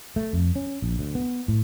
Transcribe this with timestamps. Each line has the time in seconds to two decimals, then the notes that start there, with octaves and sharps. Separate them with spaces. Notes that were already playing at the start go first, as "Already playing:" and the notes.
0.16 A3
0.33 F2
0.56 C#4
0.82 A#1
0.99 D2
1.15 B3
1.48 A2